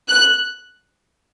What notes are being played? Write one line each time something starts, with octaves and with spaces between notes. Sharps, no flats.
F#6